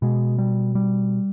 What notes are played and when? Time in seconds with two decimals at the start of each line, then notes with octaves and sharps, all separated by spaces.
0.02 B2 G#3
0.38 G3
0.75 G3